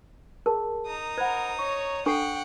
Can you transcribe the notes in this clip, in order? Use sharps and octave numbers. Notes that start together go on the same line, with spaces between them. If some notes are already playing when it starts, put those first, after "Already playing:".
G#4 A#4 A5
D#4 A#5 D#6
A#4 C5 F#5 B5 G#6
C#5 C#6 A#6
D4 A4 F#5 G5 C#6 C7